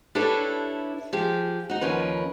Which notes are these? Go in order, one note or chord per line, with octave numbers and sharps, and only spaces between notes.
D4 E4 G4 A4 B4 C#5
F3 G4 G#4
D#4 F#4
D#2 F3 C#4 A#4 B4